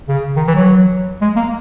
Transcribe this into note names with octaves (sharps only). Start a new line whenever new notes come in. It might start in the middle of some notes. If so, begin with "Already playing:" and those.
C#3
D#3
E3
F#3
G#3
A#3